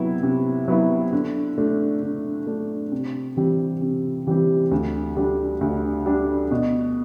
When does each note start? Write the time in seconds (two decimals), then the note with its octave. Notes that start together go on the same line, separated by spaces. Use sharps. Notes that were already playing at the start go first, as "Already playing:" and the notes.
Already playing: C3 F#3 B3 E4
0.23 C3
0.68 F#3 B3 E4
1.13 D3
1.58 A3 D4
2.02 D3
2.47 A3 D4
2.92 C3
3.37 E3 G3 C4 G4
3.82 C3
4.27 E3 G3 C4 G4
4.71 D2
5.16 D3 G3 D4
5.61 D2
6.06 D3 G3 D4
6.51 B2